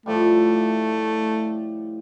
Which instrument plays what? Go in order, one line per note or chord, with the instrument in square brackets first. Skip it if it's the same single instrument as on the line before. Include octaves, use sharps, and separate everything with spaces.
[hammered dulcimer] A2 F3 G3 [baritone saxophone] A3